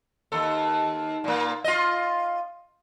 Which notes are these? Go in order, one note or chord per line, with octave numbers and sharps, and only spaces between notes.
D#2 A4
A#2 A#3
F4 D#5